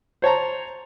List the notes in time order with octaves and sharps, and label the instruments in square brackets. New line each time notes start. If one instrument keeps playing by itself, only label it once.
[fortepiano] C5 C#5 A5 A#5